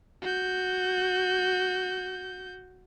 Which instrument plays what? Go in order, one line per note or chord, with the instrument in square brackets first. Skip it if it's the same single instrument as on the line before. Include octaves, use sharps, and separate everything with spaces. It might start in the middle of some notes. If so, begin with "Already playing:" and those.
[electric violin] F#4 G6